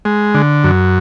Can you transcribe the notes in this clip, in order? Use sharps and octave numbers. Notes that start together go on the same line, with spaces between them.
G#3
D3
F#2